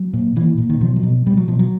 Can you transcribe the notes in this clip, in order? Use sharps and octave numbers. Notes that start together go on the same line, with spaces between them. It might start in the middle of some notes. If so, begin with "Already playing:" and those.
Already playing: F#3
A#2
A#2 E3
A#2
D#3
B2 F3
F#3
B2
B2 G3
F#3
B2 F3
F#3